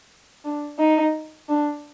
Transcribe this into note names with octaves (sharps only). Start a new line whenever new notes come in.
D4
D#4
D4